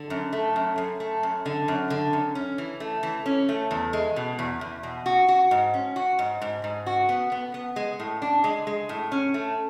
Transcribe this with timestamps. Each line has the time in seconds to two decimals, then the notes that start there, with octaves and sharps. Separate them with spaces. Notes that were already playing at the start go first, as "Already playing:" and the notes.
Already playing: D3
0.10 F#2
0.33 A3
0.56 F#2
0.78 F#2
1.00 A3
1.23 F#2
1.46 D3
1.68 F#2
1.90 D3
2.13 F#2
2.35 C#4
2.58 E3
2.80 A3
3.03 E3
3.26 C#4
3.49 A3
3.71 E2
3.93 G#3
4.16 B2
4.39 E2
4.61 E2
4.83 B2
5.06 F#4
5.29 F#4
5.51 G#2
5.74 C#4
5.96 F#4
6.19 G#2
6.41 G#2
6.64 G#2
6.86 F#4
7.09 B3
7.32 B3
7.54 B3
7.76 G#3
8.00 A2
8.22 D4
8.44 G#3
8.67 G#3
8.89 A2
9.12 C#4
9.34 A3